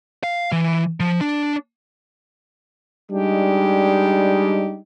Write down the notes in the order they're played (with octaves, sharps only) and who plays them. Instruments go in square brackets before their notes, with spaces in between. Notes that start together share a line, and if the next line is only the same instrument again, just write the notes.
[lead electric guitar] F5
E3
F3
D4
[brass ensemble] G3 G#3 D4 D#4 G4